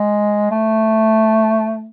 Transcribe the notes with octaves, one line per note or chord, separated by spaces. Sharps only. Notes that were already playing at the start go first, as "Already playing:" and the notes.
Already playing: G#3
A3